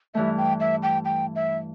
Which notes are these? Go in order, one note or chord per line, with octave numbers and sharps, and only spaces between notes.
G2 E3 A3 E5
G5
E5
G5
G5
E5